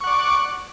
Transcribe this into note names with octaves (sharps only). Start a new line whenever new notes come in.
D5 F#5 C#6